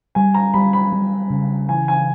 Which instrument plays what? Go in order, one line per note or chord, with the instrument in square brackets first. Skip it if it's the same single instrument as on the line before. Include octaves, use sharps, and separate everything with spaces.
[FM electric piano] G3 [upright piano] G#5
[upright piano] A#5
[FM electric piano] G3 [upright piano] B5
[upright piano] B5
[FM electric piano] G3
C#3
[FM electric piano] E3 [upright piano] G#5
[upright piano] G#5